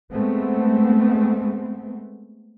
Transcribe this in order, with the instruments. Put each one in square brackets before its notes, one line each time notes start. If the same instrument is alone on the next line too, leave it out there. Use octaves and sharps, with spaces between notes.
[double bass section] G#3 A3 B3 C4